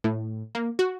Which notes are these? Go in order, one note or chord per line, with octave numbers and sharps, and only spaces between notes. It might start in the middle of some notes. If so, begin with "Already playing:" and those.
A2
A#3
F#4